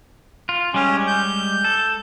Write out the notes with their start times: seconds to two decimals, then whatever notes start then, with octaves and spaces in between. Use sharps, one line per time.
0.49 F4
0.74 G3 G#3 C#4 G4
1.07 G6
1.64 A4